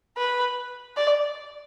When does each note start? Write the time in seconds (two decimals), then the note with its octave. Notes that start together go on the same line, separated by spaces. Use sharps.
0.17 B4
0.97 D5